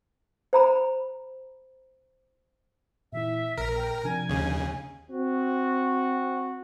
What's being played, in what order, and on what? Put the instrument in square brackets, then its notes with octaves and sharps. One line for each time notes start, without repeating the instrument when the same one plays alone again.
[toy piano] C5 A#5 B5
[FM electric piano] A#2 E3 E4 [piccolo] E5
[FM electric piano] A#1 A#2 [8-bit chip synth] A#4
[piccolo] G5
[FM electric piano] C3 F3 D4 [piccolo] G#5
[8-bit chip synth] D#2 C#3
[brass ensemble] C4 F#4